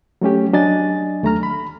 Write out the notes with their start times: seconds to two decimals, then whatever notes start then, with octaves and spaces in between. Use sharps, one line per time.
0.21 F#3 A3 C#4 G4
0.53 F#3 D4 D#5 G#5 A6
1.23 D#2 A3 A#5 F6
1.43 B5